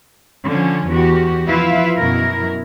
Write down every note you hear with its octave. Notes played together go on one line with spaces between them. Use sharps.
D3 F3 C#4
E2 F#4 G4
F3 E4 F4 B4 E5 F5
F#2 B2 E4 A#4